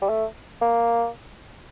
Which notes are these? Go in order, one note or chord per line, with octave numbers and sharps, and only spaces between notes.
G3
A3
A#3